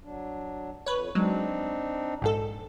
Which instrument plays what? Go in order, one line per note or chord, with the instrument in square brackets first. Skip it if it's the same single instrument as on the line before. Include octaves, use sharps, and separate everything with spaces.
[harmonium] F#3 D4
[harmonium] F2 [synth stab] B4 C#5
[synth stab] F#3 G#3 [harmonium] C4 D4 D#4
[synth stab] A#1 G#2 A4